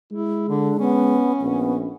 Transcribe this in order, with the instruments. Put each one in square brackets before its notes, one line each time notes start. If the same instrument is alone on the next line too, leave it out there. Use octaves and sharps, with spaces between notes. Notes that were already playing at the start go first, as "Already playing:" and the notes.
[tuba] G#3 [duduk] E4
[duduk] D3 [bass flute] D4
[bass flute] B3 [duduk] C#4
[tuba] A#1 [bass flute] B3